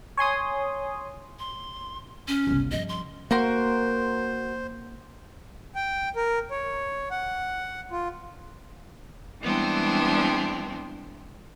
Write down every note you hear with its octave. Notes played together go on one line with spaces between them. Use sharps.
C#5 G#5 C6 D#6
C6
C#4
G1 C2
G2 F3 D#5
C6
A#3 F#4 A#4 C5 C6
G5
A#4
C#5
F#5
F4
E3 G3 G#3 B3 C4 D4